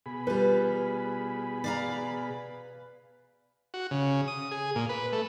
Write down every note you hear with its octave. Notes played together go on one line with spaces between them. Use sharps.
B2 G#4 B5
G3 F4 B4
D5 F5 A#5
F#4
C#3
D#6
G#4
A#2
B4
A3